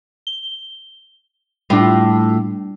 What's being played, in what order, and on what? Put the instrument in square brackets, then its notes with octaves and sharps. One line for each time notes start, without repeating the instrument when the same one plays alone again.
[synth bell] G7
[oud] A2 F4 [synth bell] G3 D4